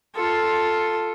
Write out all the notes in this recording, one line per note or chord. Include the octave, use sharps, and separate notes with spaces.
F4 A4